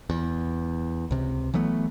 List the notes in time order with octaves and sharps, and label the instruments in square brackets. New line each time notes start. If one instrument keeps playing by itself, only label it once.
[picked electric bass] E2
C#2 C3
E3 F#3 A3 B3